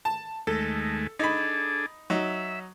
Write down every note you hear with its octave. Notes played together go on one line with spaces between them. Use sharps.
A5
D#2 G#3 A3 A4
D4 D#4 G#4 A4 B5
F#3 D#4 E5